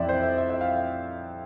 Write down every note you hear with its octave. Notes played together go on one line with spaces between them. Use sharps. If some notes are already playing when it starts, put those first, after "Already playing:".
Already playing: F2 E3 D5 E5
C5
E5
E5
E5
F5